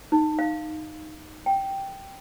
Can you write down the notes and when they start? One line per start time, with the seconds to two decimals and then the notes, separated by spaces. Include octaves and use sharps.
0.12 D#4
0.39 F5
1.46 G5